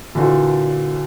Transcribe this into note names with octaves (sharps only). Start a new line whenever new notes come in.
A#2 D3 E3 F#4 A4